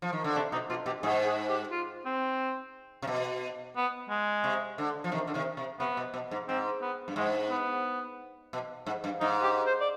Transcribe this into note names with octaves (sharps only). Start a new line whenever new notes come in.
F3
D#3
D3
C3 D4
B2 D#4
B2 F4
B2 G4
G#2 G#4
G#4
G4
F4
C4
C3
B2
B3
G#3
C3
D3
F3
C3 D#3
D3
C3 D#3
C3
C3 B3
B2
B2
G#2
G#2 C4
B3
G2
G#2 G#3
B3
B2
G#2
G2
G#2 D#4
G4
C5
D5